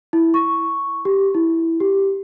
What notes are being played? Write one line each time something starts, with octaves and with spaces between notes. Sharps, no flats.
E4
C#6
G4
E4
G4